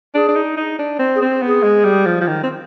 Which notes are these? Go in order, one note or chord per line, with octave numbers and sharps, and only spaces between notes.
D4 G#4
D4
D#4
D#4
D4
C4
G#4
C4
B3
G#4
G#3
G3
F3
F3
D#3
C4